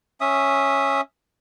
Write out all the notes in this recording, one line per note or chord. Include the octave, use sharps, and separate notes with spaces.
C#4 E5 D#6